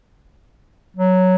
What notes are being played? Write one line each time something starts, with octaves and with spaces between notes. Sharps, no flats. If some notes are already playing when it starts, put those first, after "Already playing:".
F#3